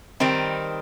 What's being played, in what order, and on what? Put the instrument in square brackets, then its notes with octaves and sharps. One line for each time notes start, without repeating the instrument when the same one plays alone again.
[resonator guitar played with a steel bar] D#3 G3 C4 D#4